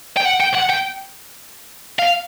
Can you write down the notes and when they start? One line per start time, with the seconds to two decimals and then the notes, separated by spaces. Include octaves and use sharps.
0.17 G5
0.25 F#5
0.40 G5
0.54 F#5
0.69 G5
1.99 F5